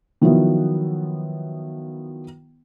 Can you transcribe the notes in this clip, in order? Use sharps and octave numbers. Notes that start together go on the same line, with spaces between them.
D#3 F3 F#3 B3 E4